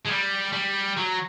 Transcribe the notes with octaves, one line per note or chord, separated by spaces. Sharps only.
G#3
G3
G3
F#3